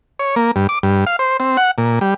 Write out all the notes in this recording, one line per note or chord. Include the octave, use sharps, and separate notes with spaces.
C#5
A#3
G2
D6
G2
F5
C5
C4
F#5
A#2
G3